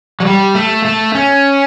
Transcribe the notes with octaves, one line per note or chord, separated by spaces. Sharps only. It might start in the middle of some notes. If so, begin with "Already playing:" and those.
F#3
G3
A3
A3
C#4